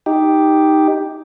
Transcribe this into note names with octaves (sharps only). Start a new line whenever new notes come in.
D#4 G4